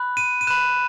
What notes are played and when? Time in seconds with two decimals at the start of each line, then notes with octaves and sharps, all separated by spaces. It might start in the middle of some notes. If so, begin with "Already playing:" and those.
Already playing: B5 F#6
0.17 D#7
0.41 D#7
0.47 B5 F#6 E7